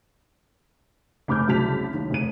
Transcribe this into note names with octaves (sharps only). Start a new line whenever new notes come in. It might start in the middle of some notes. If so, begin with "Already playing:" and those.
F1 B5 D6 F6 G6
C2 C#3 F#3 A5 B6 F7
D#2
F1 D#7